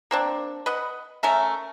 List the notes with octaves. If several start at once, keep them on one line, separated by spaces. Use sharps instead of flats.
A#3 C4 D4
B4 D#5 F#5
A3 C#4 A#4 E5